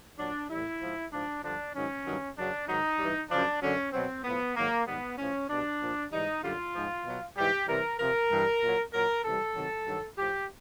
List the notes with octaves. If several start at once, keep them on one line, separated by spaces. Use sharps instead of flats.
A#2 F#3 D4
A2 E3 G3 E4
G#2 F3
G#2 F3 D4
G2 D3 F3 D4
G#2 D#3 F#3 C#4
G2 D#3 F#3
F#2 C#3 F#3 D4
G#2 D#3 F#3 D#4
G2 E3 G3
F#2 C#3 F3 D4
F#2 D3 F#3 C#4
B2 F#3 C4
A2 F3 B3
G#2 D#3 F#3 A#3
G#2 D#3 G3 B3
A2 F3 C#4
B2 G3 D4
A#2 F3
G#2 E3 G3 D#4
F#2 D3 G3 F4
G#2 F3
B2 F#3
G#2 E3 G3 G4
C3 E3 G3 A#4
C3 F3 A#4
G2 E3 G3
A#2 F#3
A#2 F#3 A#4
C3 E3 G3 A4
C3 D#3 F#3
G2 D#3 F#3
A2 F3 G4